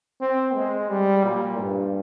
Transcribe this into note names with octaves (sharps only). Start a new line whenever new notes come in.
C4
G#3
G3
A#2
G2